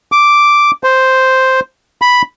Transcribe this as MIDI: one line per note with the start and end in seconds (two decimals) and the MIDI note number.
0.12 0.71 86
0.84 1.60 72
2.02 2.22 83